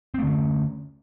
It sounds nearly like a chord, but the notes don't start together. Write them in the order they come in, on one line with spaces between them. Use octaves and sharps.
C4 A3 D3 C#4